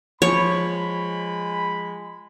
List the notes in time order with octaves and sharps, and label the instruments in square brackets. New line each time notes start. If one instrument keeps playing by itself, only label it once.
[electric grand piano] F3 [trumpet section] G#3 B5 [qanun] C#5